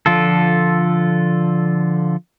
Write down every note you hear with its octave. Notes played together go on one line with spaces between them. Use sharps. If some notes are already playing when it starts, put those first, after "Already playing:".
D3 F3 F4 A4